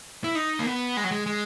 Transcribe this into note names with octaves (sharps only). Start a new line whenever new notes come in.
E4
D#4
A#3
B3
G#3
F#3
G#3
G#3